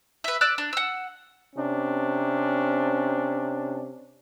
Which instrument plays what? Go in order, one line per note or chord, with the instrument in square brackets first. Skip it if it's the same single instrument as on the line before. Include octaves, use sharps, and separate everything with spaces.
[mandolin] B4 E5
D5 E6 F#6
D4
F#5 E6
[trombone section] C3 C#4 D4